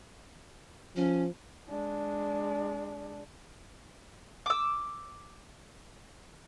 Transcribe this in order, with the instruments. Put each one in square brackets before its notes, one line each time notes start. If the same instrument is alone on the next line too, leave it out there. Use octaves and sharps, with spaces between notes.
[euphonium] F3 [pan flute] C#4
[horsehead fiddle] G#3 D4
[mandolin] D6 E6